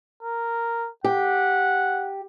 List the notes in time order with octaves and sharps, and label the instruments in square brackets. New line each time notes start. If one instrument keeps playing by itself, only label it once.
[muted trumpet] A#4
[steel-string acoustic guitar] G4 [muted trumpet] F#5